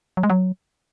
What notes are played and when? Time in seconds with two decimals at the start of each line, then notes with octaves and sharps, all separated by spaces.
0.17 F#3
0.23 G#3
0.30 F#3